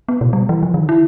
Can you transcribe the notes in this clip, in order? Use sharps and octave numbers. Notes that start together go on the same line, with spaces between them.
B3
B2
G3
E3
F3
D#3
E4